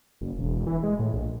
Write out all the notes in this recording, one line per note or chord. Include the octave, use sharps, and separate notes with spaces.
F#1
E1
E3
G#3
A2
A#1